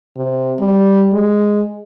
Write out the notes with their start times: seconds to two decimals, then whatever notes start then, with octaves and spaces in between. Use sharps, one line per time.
0.16 C3
0.59 G3
1.13 G#3